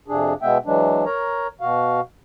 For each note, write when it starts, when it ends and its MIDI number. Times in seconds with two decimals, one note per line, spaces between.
0.08 0.33 41
0.08 0.33 48
0.08 0.33 62
0.08 0.33 68
0.42 0.58 47
0.42 0.58 56
0.42 0.58 59
0.42 0.58 76
0.42 0.58 79
0.66 1.05 52
0.66 1.05 54
0.66 1.05 56
0.66 1.05 62
1.05 1.47 70
1.05 1.47 73
1.05 1.47 82
1.61 2.00 47
1.61 2.00 66
1.61 2.00 77